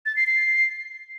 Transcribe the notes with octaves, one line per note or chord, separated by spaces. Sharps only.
A6
C7
C7